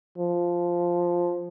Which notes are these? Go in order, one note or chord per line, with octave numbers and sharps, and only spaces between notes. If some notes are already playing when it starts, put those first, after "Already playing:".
F3